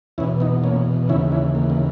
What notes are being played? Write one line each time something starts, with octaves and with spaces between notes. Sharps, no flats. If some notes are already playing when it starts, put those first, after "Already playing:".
E2 B2 C#4 E4
B3 D#4
A#3 C#4
D#2 C#3 E3 C#4 E4
C#4 E4
A#3
A#3